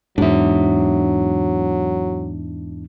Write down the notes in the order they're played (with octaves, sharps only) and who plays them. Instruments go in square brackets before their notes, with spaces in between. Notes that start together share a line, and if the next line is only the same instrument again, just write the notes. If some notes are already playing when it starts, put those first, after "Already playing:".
[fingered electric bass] E2 G#2 [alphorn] F#3 [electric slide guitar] D4 E5